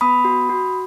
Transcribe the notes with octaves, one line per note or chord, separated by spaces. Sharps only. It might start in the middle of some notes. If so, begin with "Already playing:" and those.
B3 B5 D#6
F#4
F#4